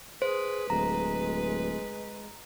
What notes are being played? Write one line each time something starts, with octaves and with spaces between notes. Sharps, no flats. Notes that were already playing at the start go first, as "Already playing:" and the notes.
G#4 B4 C5
D1 G#3 A#5